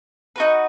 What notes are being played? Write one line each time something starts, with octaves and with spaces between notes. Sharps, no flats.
D#4 F#4 B4